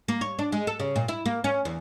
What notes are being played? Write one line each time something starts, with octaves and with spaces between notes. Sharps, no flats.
A#3
C#5
D4
G#3
A4
C#3
A#2
E4
A#3
C#4
E2